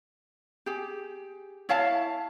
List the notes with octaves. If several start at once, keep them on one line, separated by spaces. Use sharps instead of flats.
G4 G#4
E4 C#5 F5 A5